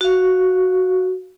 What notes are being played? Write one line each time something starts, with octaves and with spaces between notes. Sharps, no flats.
F#4 F5